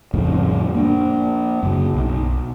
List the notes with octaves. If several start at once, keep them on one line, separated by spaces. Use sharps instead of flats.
F2 A2 C#3
A#3 D4
F#2 C#3
B1